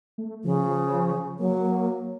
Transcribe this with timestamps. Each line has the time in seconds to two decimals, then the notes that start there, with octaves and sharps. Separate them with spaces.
0.18 A3
0.44 C#3 F3
1.39 F#3 A#3